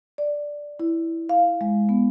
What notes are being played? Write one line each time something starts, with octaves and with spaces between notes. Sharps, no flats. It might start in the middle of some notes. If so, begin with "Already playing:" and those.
D5
E4
F5
G#3
B3